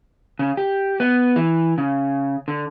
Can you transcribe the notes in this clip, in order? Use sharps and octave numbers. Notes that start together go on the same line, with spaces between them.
C#3
G4
B3
E3
C#3
D3